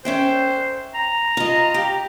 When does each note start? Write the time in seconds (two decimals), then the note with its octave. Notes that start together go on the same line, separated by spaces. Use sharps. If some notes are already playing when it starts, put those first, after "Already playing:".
0.05 C#4 C5 E5 G5
0.94 A#5
1.37 F4 D#5
1.74 G4